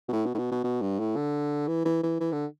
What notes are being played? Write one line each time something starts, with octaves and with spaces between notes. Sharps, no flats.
B2
A2
B2
A2
B2
B2
B2
G2
A2
D3
E3
E3
E3
E3
D3